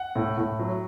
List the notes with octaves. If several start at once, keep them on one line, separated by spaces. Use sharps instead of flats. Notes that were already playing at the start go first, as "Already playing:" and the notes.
Already playing: F#5
A2
A2
F#3